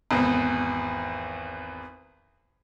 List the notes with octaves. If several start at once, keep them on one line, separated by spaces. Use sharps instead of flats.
G#1 E2